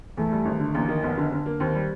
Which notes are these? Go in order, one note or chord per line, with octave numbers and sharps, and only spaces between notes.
E2 A3
G3
G#1
D3
A1 A#3
D#3
F1 B3
D3
D3
A#3
D#2 C4
G3